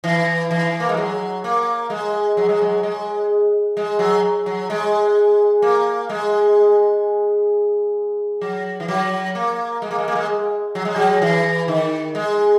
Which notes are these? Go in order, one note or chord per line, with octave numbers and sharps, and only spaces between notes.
E3
E3
A#3
G#3
F#3
A#3
G#3
F#3
G#3
F#3
G#3
G#3
F#3
F#3
G#3
A#3
G#3
F#3
E3
F#3
A#3
G#3
A#3
G#3
A#3
G#3
F#3
G#3
F#3
E3
D#3
G#3